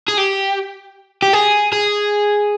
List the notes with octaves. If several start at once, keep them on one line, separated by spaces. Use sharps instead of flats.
G#4
G4
G4
G#4
G#4